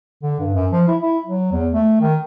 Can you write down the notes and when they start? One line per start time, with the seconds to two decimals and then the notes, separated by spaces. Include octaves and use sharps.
0.23 D3
0.40 G2
0.54 F#2
0.72 F3
0.88 E4
1.02 E4
1.26 F#3
1.52 E2
1.72 A3
2.01 D#3